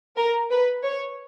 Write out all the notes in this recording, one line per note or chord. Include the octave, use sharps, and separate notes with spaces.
A#4
B4
C#5